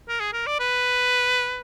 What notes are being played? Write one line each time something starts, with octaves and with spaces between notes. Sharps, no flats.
A#4
G#4
A#4
D5
B4